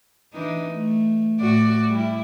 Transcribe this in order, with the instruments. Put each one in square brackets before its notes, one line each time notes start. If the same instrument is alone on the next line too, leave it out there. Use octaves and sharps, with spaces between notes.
[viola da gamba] E3 D4 D#4
A3
A2 F#4 D5
G3 E4